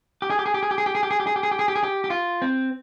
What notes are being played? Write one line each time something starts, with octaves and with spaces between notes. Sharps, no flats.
G4
G#4
G4
G#4
G4
G#4
G4
G#4
G4
G#4
G4
G#4
G4
G#4
G4
G#4
G4
G#4
G4
G#4
G4
G4
F4
C4